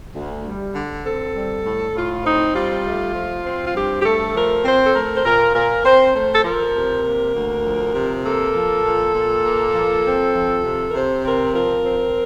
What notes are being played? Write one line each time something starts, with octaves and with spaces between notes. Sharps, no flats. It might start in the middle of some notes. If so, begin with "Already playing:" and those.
D2
G3
D3
C4 A4
G3
A2
A2 F4
C4 D#4
G3 F4
A3
F3
C4
F4
G2 G4
G4
A3 A4
F3 A#4
C4 C5
A4
A3 A#4
C5
A#2 A#4
A#2 A#4
C4 C5
A3 C5
A4
F3 A#4
C3
A#3
D2
F3
C3
A#3 A4
F3
A#2
A#2
A#3
F3
C4
F3
C3
A#4
C3 C5
C4 A#4
F3 A#4
C4